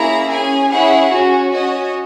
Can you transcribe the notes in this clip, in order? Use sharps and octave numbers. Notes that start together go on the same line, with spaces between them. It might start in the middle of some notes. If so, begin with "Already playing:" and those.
Already playing: A#3 C#4 E4 G#4 A#5
C#4 G#4 G#5
C#4 E4 G#4 F#5
C#4 F#4
C#4 F#4 D#5